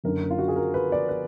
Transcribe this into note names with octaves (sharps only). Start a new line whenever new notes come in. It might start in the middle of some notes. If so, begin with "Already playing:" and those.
F#1 F#2 D3 A#4
F4
F#4
G#4
A#4
B4
D5
B4